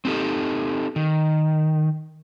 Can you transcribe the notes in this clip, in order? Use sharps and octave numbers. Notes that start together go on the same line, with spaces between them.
C4 D#4 G4 A4
D#3